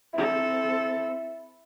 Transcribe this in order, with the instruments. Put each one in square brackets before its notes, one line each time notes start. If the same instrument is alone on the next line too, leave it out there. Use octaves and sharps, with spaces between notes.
[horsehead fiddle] C4 A4 [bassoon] E4